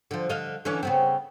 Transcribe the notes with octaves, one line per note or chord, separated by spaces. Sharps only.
D3 F3
D3 D#5 F5
D3 E3 C#4
C#3 B3 C4